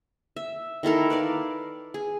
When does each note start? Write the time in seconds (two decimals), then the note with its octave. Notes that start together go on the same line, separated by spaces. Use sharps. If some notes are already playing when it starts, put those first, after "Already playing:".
0.36 E5
0.83 D#3 E4 A4 A#4
1.10 B4 D5 F5
1.94 G#4